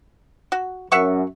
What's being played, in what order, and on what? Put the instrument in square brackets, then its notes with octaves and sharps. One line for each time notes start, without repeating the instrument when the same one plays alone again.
[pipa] F#4
[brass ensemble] F#2 [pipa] E5 F#5 C#6